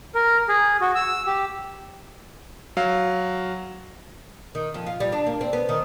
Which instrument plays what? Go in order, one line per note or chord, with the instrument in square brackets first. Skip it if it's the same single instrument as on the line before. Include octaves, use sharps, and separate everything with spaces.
[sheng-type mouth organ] A#4
G#4
F#4
E6
G4
[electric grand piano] F#3 F5
[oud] D#3
F2
F4
G3
D4
A#3
C4
B3
D#3